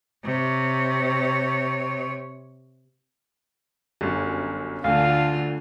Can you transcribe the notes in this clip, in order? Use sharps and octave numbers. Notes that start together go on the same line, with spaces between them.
C3 C#5
G1 F#2
D2 D3 A3 F4 F5